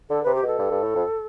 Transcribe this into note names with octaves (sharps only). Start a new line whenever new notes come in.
D3 A4
C3 B4
G4
B2 A4
G2
G2
A2
F2